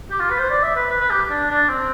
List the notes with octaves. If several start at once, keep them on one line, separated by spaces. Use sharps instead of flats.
G4
F4
B4
C5
D5
E5
B4
B4
B4
G4
D4
D4
C4